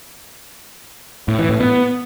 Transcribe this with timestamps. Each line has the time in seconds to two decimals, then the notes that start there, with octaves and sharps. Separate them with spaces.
1.28 A2
1.39 E3
1.49 A2
1.60 B3